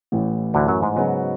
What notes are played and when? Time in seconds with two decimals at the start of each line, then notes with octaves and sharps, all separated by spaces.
0.12 A1 A2 E3
0.54 D2 D3
0.68 F#2 F#3
0.82 G#2 G#3
0.96 C#3 F#3 B3 F#4